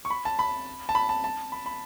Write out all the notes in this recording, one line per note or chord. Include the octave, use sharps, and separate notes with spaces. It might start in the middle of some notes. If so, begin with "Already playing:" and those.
C#6
B5
A5
B5
A5
B5
A5
A5
B5
B5